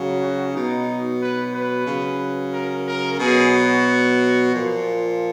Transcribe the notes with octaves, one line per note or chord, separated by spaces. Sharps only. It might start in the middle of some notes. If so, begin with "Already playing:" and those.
Already playing: C#3 F#3
F#4
B2 F#3 D#4
B4
B4
C#3 F#3
A#4
A#4
B2 F#3 G#4
F#4
A#2 F3